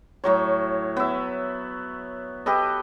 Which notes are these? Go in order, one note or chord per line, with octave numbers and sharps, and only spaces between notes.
A2 F#3 C#5
B3 E5
G4 A4 B4 D#5